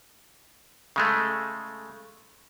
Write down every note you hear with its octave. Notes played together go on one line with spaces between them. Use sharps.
C#3 G#3 A3